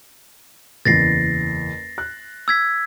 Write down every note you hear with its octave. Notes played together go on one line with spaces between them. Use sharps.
F#1 E2 A6 A#6 C7
F#6
E6 G#6 B6